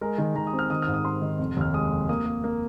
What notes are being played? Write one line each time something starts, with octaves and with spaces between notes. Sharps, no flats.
G#3 A#4
D#3 A#4
D#3 A#5
D#6
C4
F6
D#3 D#6
G#2 F6
D#6
C4 C6
D#3
F1
D#2 F6
G#3 D#6
F1
A#3 D#6
A#3
A#3